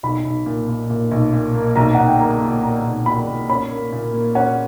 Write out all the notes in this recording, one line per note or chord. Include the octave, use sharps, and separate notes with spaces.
B1 B5
B1
A#2
A#2
A#2
B1
A#2
A#3
B1 A#5
B1 F#5
G5
A#3 A#5
A#2
A#2 A#5
B1
A#2 B5
A#2
C#4 B5
A#3
A#2
A#3
C#4 F#5